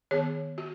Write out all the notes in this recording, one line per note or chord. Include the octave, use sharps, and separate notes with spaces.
D#3 B3 G#4 C#5
F#4